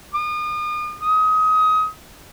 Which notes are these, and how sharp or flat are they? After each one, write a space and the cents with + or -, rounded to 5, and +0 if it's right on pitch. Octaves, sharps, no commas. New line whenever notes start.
D#6 -40
D#6 +25